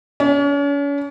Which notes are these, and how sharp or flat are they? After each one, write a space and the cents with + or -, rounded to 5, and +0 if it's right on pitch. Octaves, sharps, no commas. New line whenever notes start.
C#4 +40